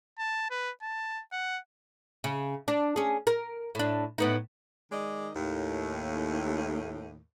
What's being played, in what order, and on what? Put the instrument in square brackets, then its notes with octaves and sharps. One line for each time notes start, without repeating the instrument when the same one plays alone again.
[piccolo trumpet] A5
B4
A5
F#5
[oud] C#3
D4
C#4 G#4
A#4
A2 D4
A2 B3 D#4
[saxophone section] D#3 G#3 D5 D#5
D#2 A2